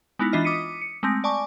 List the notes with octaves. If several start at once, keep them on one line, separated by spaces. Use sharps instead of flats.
G#3 B3 D#4 E4
E3 D4 F4 D#5 F6
D6 D#6 B6 C#7 D#7
C#7
G#3 A3 C4 A#6
D5 G#5 A5 C#6 D6